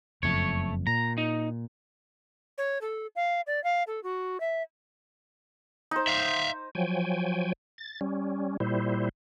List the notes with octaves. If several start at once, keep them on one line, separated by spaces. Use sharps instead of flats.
F#1 F2 A3 C#5
A#2 A#5
D#4
C#5
A4
F5
D5
F5
A4
F#4
E5
D#4 C5
E5 F5
F3 F#3 G5 G#5
A6
G3 C#4
A#2 G3 E4 C5